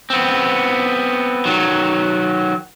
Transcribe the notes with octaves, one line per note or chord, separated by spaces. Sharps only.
B3 C4
D#3 F#3